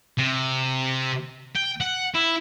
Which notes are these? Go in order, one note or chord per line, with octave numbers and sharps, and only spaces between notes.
C3
G5
F#5
E4